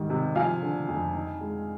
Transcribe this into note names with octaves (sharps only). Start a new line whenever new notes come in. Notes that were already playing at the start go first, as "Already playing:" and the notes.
Already playing: G#2 D#3 G3
C3
F3 F5 G#5
D3
F2
D#4
G#3